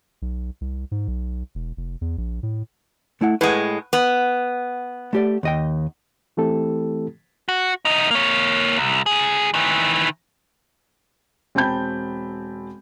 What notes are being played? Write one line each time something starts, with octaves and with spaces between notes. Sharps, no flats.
B1
C2
G#2
B1
E1
F1
E2
A#1
A2
A3 E4 F#5
A2 G#3 B4 F#5
B3
A3 G4 D5
D#2 D#5 G5
E3 A3 C4 E4 G4 A4
F#4
E2 D#4
A#3 C#5
C2
D2 G#4
D#3 E3
E1 C4 G5 A5 B5 G6